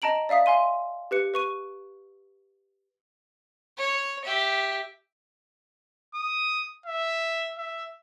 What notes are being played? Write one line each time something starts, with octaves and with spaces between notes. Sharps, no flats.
D#5 A5 A#5 D7 F#7
D5 E5 F5 D#6 B6
F5 G#5 C6 D#7
G4 B4 C#7
B4 C#6 D#7
C#5
G4 E5
D#6
E5
E5